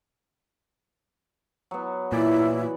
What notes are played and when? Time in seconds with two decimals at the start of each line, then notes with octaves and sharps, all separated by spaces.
1.71 F#3 B3
2.12 A#2 E3 F#3 E4 D5